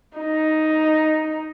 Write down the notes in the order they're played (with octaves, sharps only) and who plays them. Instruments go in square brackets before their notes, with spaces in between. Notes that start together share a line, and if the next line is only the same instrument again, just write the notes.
[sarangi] D#4